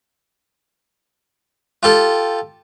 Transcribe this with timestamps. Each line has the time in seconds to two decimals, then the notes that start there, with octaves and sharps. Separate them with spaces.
1.83 F4 G4 A4